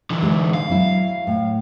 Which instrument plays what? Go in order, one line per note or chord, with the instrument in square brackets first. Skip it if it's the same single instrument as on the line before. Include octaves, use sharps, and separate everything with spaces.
[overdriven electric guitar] D3 E3
[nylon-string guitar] G#3
[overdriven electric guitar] F5
[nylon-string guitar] F#3 E4
A2